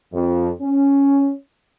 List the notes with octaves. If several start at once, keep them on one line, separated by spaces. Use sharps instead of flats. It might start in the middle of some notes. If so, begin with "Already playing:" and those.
F2
C#4